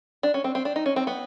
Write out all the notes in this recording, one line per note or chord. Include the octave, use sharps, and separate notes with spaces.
D4
C#4
C4
C4
D4
D#4
C#4
C4
B3